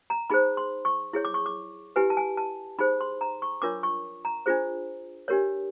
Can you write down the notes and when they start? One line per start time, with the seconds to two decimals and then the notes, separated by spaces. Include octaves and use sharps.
0.10 A#5
0.30 D#4 G#4 C5 B5
0.57 C6
0.85 C#6
1.13 E4 G#4 C#5
1.25 D6
1.34 C#6
1.46 D6
1.96 E4 G4 B4 G#5
2.10 A5
2.17 G#5
2.37 A5
2.79 D#4 G#4 C5 B5
3.01 C6
3.21 A#5
3.42 C#6
3.62 D4 F4 A#4 C#5 D6
3.83 C#6
4.25 A#5
4.46 D4 F4 G#4 C5
5.28 D4 G4 A#4 C#5